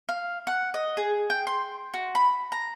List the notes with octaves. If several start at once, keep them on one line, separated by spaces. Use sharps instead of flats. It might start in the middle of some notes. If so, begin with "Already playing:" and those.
F5
F#5
D#5
G#4
G5
C6
F#4
B5
A#5